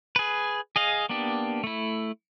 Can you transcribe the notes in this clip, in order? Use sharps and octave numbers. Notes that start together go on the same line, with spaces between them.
G#4 B4
G#4 D#5 F5
A#3 B3 D4 G4
A3 E4